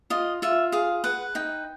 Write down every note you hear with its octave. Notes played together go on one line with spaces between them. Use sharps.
F4 D#5
F4 E5
G#4 F5
B4 F#5
D#4 G5